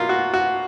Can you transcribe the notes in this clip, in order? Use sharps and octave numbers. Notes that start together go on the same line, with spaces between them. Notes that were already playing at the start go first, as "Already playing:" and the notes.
Already playing: B2 F#3 A#3 F4
F#4
F#4